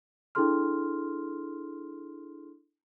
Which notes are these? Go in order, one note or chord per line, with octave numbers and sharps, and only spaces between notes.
D4 E4 G#4 A4 C6 F6